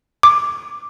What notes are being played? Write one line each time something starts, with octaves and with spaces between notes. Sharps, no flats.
D6